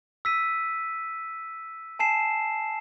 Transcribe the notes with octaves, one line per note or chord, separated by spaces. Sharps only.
E6 B6 D#7
G#5 A5 C7 E7